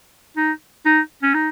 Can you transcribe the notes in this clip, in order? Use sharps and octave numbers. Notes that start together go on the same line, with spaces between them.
D#4
D#4
C#4
D#4